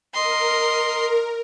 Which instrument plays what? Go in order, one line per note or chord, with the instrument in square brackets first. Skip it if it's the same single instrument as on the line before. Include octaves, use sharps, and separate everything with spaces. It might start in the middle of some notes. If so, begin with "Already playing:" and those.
[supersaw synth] A#4 [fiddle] D#5 C6